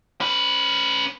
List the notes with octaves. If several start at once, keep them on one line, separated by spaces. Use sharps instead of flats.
C#4 B4